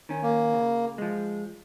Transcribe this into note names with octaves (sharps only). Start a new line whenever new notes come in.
D#3 C#4
A#3
C#3
F3 G#3